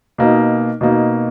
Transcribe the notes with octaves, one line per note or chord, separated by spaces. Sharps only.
B2 A#3 D#4
B2 A#3 D#4